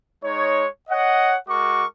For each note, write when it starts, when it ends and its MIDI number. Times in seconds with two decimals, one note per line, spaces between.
0.24 0.66 56
0.24 0.66 63
0.24 0.66 73
0.90 1.36 73
0.90 1.36 75
0.90 1.36 78
1.49 1.85 56
1.49 1.85 66
1.49 1.85 70
1.49 1.85 85
1.49 1.85 86